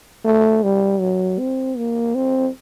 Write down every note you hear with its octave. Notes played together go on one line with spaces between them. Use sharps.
A3
G3
F#3
C4
A#3
C4